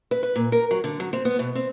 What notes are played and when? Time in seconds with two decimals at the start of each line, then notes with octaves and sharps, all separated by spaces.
0.11 B4
0.23 B4
0.36 A#2
0.52 A#4
0.71 F#3
0.84 D3
1.00 F#3
1.13 C4
1.25 B3
1.39 B2
1.55 C4